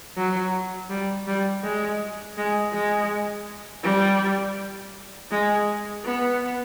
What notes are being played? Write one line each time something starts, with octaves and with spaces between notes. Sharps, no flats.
F#3
G3
G3
G#3
G#3
G#3
G3
G#3
B3